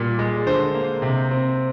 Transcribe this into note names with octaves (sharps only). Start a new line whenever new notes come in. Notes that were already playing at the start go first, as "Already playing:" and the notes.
Already playing: A#2 G3
G#3
D3 C5
A#3
C3
C4